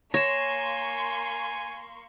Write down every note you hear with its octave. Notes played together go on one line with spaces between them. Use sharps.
A#3 C#5 G#5 C6 C#6 A#6 E7